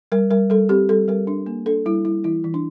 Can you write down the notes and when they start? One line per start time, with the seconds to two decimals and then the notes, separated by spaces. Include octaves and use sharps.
0.12 G3 A#4
0.30 G3 A#4
0.50 G3 A4
0.69 C4 G4
0.89 G3 A4
1.08 G3 A#4
1.27 D4
1.46 A#3
1.66 D4 A4
1.86 G3 E4
2.05 G3 E4
2.24 E3 E4
2.44 E3
2.54 D4